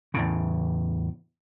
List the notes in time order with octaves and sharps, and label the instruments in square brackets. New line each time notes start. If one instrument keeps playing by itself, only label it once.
[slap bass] E2 A2 C#3